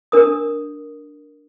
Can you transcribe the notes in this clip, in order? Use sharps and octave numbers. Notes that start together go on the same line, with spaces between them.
D4 A#4 D#6